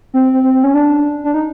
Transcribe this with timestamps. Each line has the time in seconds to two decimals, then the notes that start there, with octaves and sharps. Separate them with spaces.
0.14 C4
0.34 C4
0.44 C4
0.54 C4
0.64 C#4
0.74 D4
1.24 D4
1.34 D#4